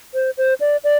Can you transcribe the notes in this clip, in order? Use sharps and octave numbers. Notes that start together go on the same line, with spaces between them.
C5
C5
D5
D5